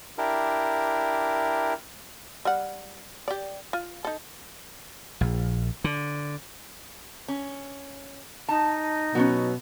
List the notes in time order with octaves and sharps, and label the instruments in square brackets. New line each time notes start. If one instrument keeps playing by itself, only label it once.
[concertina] D4 E4 G4 A#4
[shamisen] G3 F#5
G4 D5
F4
D#4 A4
[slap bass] A#1
D3
[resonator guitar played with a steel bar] C#4
[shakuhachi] D#4 [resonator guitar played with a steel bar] A5
[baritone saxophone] B2 [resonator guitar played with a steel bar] F#3 B3 C#4